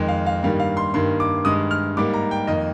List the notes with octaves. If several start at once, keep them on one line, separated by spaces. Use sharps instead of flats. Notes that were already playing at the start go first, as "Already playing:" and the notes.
Already playing: F2 D#3 G#3
F5
F5
G2 D#3 G3 A#3 F5
F5
C6
G2 D#3 A#3 C6
D6
G2 D#3 G#3 D#6
F6
G#2 G3 A#3 D6
A#5
G5
F2 D#3 A#3 D#5